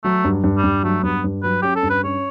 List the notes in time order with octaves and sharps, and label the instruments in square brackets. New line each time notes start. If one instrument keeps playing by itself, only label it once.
[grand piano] F#3 [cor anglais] A3
[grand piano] G2
G2
[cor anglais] G3
[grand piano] G2
[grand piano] F#3 [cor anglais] A3
[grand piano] G2 [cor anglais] B3
[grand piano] G2
[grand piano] F#3 [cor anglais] B4
[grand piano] C#4 [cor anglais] G4
[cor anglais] A4
[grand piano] G2
[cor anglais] B4
[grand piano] C#4 [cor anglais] C#5